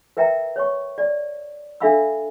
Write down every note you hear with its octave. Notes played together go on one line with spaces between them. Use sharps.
A#4 B4 E5 G5 A#5
C#5 C#6
D5
D4 A4 E5 F5 B5 E6